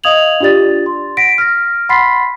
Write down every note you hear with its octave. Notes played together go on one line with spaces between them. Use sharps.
D#5 F5 D#6 G#6 F7 F#7
D4 F4 G4 D5 A6
C6
F#5 A#6 B6 D7
F6 A#6
F#5 B5 C6 A6 B6 C7